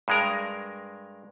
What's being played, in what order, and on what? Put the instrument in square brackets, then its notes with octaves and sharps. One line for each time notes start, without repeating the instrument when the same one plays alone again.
[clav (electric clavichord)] G2 G#3 A#4